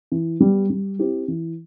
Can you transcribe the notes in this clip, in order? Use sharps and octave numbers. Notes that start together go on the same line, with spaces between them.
E3
G3 B3
G3
C4 E4 G4
E3